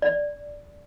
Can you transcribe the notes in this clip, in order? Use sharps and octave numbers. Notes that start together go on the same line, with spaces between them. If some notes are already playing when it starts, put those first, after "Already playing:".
D5